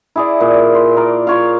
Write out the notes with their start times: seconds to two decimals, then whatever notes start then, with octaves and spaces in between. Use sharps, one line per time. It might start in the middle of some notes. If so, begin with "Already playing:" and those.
0.16 E4 G#4 D5
0.41 A#2
0.75 C6
0.97 A#4 D5
1.27 F4 C#5 F5